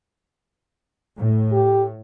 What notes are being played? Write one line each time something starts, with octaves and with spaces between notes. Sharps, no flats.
A2
G4